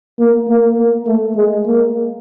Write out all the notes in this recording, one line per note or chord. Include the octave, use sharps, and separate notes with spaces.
A#3
A#3
A#3
A3
G#3
A#3